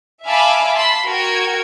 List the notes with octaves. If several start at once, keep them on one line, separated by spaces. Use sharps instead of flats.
E5 F5 G#5 A5 B5 D6
A5 B5 C6 B6
F#4 A#4 G5 G#6